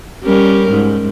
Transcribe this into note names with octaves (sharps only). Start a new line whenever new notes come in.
G3 C#4 A#4
G#2